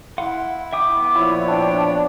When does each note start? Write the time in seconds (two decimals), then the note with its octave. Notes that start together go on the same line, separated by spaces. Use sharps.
0.18 E4 F5 F#5 C6
0.73 E5 G5 D6 D#6
0.97 B3
1.16 A#2 F3 E4 C#5
1.48 D4 G5
1.86 D5